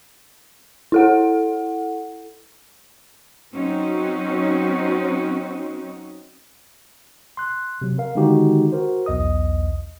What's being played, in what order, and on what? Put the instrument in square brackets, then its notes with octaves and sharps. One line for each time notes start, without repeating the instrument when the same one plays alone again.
[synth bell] E4 A4 F#5
[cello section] F#3 C4 C#4 D#4 F#4
[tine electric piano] C6 F#6
C3 F#3
A#4 F5
D3 D#3 G#3 D#4 F#4 G4
F#4 A#4 C5
B1 E2 D#5 D#6